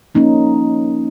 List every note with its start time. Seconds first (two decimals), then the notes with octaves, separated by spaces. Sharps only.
0.15 F3 A#3 C#4 D#4